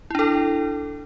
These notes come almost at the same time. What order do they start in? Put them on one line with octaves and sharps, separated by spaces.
E4 D4 A4